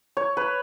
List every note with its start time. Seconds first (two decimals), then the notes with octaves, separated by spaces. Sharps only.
0.17 C#5
0.37 B4